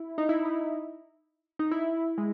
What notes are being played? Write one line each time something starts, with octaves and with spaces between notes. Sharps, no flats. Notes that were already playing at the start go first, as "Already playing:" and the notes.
Already playing: E4
D#4
E4
D#4
E4
D#4
E4
G#3